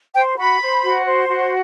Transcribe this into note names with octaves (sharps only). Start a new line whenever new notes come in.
C5 G5
F#4 B5
C5
F#4
C5
F#4